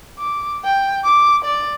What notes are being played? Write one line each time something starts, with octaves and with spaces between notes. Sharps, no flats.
D6
G5
D6
D5